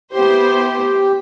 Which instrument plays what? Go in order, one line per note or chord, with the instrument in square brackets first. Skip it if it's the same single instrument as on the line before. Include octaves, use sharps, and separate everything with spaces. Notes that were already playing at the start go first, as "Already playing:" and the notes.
[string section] B3 E4 C5 [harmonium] G4